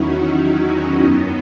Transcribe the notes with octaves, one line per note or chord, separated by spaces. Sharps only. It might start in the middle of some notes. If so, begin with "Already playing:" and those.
Already playing: E2 D#3 F#3 C#4 D#4 E4 F#4
D#4 F#4
C#4 E4
F#2 D#3 F#3 B3 D#4